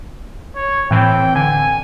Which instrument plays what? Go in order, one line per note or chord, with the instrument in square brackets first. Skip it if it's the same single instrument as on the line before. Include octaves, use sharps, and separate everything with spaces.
[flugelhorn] C#5
[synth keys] A2 E3 C4 [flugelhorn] G5
[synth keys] D3 [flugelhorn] G#5